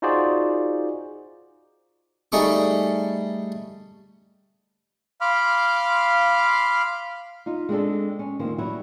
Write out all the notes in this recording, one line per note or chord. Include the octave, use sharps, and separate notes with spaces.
D#4 F4 F#4 G#4 C5 D5
G3 A3 D#4 G#4 C#6 D6
F5 B5 C6 D6 F6
D#4 F4
G#3 C4 D4 A4
C#4
D2 D#3 F3 A#3 C4
F#3 G3 E4